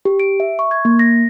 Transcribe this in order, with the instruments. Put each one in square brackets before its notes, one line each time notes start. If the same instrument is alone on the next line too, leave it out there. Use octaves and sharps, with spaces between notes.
[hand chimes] G4
D7
E5
C#6
G#6
A#3
A#6